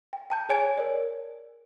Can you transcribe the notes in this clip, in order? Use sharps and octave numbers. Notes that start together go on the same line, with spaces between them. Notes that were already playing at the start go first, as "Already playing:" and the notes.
G5
G5 A5 G6
G#4 C#5 G#5 G#6 D7
A#4 C#5 D5